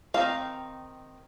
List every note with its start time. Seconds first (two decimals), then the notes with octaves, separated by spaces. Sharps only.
0.14 D#3 C4 D#4 F5